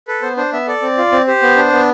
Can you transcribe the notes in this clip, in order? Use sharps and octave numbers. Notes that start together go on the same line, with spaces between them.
A4 B4
B3 C5
D4 C5
B3 E5
A4 D5
C4
F4
C4
G4 C5
B3
D4
B3